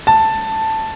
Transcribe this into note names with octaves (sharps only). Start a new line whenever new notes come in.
A5